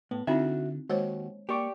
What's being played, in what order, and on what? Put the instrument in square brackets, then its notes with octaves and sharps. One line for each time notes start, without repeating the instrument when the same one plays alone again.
[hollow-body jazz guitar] A2 [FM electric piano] B3
[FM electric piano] D3 [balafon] C4 D#4 E4 [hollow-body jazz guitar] F#4 E5
[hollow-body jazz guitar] D#2 [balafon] G#3 C5 C#5 [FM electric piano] F#4
[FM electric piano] A#3 C#6 [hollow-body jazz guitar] G4 D5